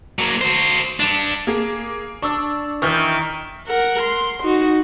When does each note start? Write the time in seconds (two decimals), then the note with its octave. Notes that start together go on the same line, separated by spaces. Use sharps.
0.19 F#3 A#3
0.41 F#4 C5
1.00 G3 D4
1.47 A#3 G#4
2.22 D4 C#6 E6
2.82 D#3 E3 C#6 F6 G6
3.67 A#4 F#5
4.02 C6
4.43 D#4 F#4